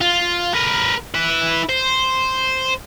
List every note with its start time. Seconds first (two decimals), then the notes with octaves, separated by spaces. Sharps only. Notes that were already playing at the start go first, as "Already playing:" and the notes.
0.01 F4
0.55 A#4 B4
1.15 E4 B4
1.69 C5